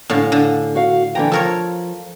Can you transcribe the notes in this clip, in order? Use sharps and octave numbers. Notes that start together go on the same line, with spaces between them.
A2 D3 C#4 F5
D3
F#4 F5
D3 E3 G5 A#5
F3 A4 A#4 C#5